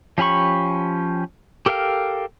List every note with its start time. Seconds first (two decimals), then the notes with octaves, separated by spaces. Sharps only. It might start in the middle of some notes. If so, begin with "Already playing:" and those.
0.18 F3 C#4 G4 B5 C#6
1.66 G4 A4 A#4 F5 G5